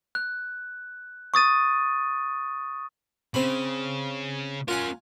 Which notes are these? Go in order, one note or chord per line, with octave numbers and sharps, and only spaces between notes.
F#6
C#6 D#6 A6 D#7
C#3 C4 B5
C#4 F4 A#4 F#5 G#5